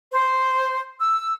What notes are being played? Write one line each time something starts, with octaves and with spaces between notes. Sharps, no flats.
C5
E6